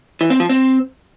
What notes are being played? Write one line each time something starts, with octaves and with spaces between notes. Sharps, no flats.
E3
C4
F3
C4